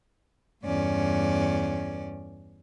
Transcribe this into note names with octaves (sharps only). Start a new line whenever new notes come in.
E2 G2 C#4 D5